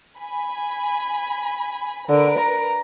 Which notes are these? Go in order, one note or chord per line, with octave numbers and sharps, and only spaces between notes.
G#5 B5
D3 A#4 B4 D7
A#5